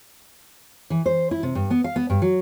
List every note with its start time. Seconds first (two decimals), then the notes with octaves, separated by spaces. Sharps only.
0.90 E3
1.06 C5
1.31 E4
1.43 C3
1.55 G2
1.70 B3
1.84 F5
1.96 B3
2.10 G2
2.22 F#3